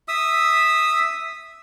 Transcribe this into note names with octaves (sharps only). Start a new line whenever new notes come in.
E5 D#6 E6